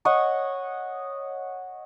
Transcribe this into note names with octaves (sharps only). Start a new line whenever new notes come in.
C#5 D#5 F#5 C#6